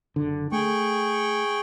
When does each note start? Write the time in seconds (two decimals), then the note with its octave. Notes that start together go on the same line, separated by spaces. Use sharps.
0.16 F#1 D3
0.52 A3 G#4 G5 C#6